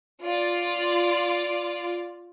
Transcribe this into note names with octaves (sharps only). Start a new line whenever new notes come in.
F4 D5